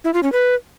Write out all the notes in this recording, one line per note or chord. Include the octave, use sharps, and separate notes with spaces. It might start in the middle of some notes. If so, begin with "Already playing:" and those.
E4
F4
C#4
B4